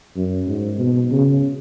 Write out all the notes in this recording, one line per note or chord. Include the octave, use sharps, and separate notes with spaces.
F#2
G#2
B2
C#3